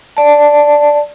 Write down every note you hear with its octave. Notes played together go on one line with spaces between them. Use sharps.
D5 A5